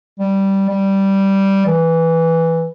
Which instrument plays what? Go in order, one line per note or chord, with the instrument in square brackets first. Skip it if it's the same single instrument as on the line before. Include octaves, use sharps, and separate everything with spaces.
[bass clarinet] G3
G3
E3